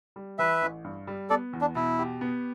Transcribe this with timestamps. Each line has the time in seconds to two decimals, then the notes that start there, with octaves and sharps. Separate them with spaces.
0.16 G3
0.39 E3 B4 E5
0.62 A1
0.84 G2
1.07 G3
1.30 B3 A4 D5
1.53 E2
1.61 D4
1.75 B2 E4
1.99 G4
2.21 B3